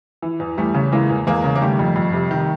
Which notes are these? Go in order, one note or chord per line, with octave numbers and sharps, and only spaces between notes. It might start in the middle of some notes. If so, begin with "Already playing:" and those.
E3
E2
E2 G3 A3
C#3
E3 G#3 A#3
E2
E2 G#3 A#3
C#3
A#3
D#3 G3 A3
F2
F2
C3
D#3